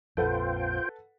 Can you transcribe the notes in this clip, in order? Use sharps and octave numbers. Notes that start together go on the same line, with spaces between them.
A#1 F2 F4 A4 B4 C5 F#5 G5